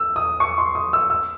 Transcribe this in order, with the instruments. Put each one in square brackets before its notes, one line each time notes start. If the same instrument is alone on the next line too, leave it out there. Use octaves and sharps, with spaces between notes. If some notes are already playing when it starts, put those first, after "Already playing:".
Already playing: [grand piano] E6
D#6
C#6
C6
D#6
E6
E6